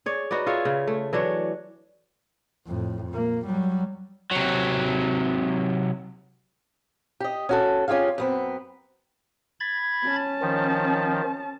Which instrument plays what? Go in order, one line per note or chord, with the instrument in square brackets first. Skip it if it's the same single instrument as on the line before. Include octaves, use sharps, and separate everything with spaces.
[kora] G#4 C#5 D5
D#4 F#4 B4 D5
F4 G#4 C#5 E5
C#3
A3
E3 F#3 D4 C#5
[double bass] F2 A2
A#2 A#3
F#3 G3
[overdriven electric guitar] C3 F#3
[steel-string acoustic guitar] G4 D#5
C#4 F#4 A4
C#4 F4 G4 G#4 F5
F#2 B3 C4
[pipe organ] B5 G#6 A6
[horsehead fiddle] C#4 A5
[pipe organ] D#3 F3